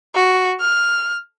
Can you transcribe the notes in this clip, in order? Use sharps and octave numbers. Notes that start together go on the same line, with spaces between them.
F#4
F6